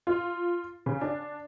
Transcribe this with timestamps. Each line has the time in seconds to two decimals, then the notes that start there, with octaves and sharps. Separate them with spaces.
0.07 F4
0.86 C#3
1.01 D4